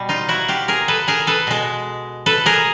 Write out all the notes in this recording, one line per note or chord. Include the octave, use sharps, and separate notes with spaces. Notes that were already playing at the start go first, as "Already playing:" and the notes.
Already playing: B2 G3
D#4 F4
E4 F#4
F4 G4
G#4 A#4
A4 B4
G#4 A#4
A4 B4
B2 G#3
A4 B4
G#4 A#4